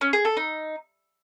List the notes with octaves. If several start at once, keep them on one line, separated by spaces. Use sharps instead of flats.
C#4
G#4
A4
D#4